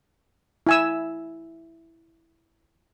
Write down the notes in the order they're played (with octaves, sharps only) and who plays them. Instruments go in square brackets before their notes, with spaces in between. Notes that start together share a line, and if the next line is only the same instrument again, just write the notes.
[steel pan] E4 G#5 E6